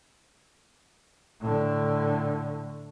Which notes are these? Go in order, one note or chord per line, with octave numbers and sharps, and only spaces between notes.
A2 D3